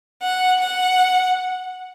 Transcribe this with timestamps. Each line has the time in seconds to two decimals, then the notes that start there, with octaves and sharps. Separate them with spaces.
0.22 F#5
0.60 F#5